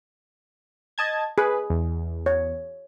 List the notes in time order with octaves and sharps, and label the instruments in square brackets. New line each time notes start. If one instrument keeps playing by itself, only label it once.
[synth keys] D#5 A5 G#6
[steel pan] G#4 [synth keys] B4
[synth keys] E2
[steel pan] C#5